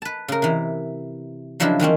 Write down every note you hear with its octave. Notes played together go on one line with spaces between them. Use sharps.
B4 A5
C#3 A#4
C3 E3
C#3 F3 F#3 D4 E4
D#3 E3 C4 C#4